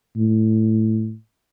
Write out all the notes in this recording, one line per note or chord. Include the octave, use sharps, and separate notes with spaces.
A2